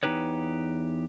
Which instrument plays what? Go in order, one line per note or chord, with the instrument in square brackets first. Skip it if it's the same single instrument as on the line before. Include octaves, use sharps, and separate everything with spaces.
[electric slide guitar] E2 B3 D#4 G4 B4 C#5